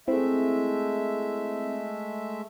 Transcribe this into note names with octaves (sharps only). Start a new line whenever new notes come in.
G#3 A3 C4 E4 E5